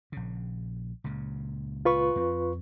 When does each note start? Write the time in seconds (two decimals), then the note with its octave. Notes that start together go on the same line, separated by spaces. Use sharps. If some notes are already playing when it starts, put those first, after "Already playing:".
0.12 A#1 C#3
1.04 C#2 A#2 C#3
1.85 F4 B4 C#6
2.16 F2 C4